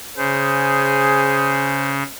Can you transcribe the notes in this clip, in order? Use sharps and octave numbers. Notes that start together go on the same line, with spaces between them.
C#3 G#4 C5